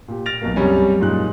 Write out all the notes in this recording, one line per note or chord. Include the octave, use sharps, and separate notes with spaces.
A#2 G4
F6 A6 A#6 D7 F7
B1 B2 A#3
C2 F#2 G3 G#3 C#4 G#5
F#2 A#2 G#3 D#4 F#6